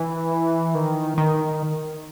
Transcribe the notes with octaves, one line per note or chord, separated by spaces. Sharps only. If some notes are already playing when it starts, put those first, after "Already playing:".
Already playing: E3
D#3
D#3